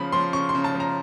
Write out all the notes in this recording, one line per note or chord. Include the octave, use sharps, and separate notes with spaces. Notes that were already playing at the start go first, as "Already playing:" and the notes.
Already playing: C#3 F3 B5
F3 C6
C#3 C#6
C6
C#3
A5
F3
A#5